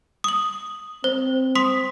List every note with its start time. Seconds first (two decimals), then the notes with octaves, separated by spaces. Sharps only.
0.24 D#6 F#7
1.04 C4 C5
1.55 C6 D#6 B6